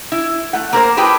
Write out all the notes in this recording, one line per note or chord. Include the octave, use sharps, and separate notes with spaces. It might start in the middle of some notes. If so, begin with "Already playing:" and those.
E4
A3 F#5
A#3 A#4 C5
E4 G4 G#4 B4 G5 A5